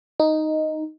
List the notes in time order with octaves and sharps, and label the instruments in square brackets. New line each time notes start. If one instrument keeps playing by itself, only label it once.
[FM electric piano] D#4